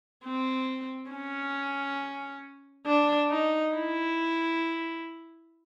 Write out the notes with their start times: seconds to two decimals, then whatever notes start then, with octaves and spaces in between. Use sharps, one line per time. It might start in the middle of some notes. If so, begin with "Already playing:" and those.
0.24 C4
1.11 C#4
2.86 D4
3.30 D#4
3.74 E4